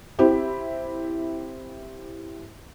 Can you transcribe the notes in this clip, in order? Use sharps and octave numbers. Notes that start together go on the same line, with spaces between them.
C4 E4 G4